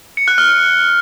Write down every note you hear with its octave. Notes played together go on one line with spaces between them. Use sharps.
C#7
F#6
F6